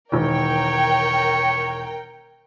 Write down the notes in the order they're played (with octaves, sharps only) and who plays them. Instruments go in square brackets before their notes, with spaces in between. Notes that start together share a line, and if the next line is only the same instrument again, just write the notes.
[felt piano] E1 D#3 [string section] A#4 G5 [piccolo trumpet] C#5